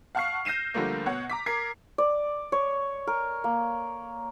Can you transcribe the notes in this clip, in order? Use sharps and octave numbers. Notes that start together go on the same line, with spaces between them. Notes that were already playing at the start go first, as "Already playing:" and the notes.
F5 F#5 A5 C#6 F6 C7
G6 A#6 C7 D#7 E7
D3 F3 G3 A3 A#3
B2 C#5 F#5
A#5 D6 B6
A#4 G#6 C7
D5
C#5
A#4
A#3